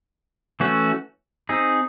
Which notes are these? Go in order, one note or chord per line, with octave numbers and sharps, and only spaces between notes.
E3 A3 C#4 F#4
C4 D#4 G#4